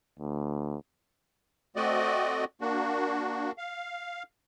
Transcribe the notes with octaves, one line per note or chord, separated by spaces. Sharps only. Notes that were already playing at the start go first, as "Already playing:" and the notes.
D2
A3 C4 F#4 D5 D#5
A#3 D4 F#4
F5